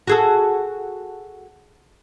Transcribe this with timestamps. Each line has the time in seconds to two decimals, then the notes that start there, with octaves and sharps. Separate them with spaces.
0.07 F#4 G#4 A4